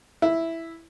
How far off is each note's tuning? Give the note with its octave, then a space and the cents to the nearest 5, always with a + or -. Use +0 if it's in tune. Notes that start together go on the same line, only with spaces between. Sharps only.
E4 +0